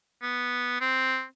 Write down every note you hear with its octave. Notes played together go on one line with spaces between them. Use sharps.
B3
C4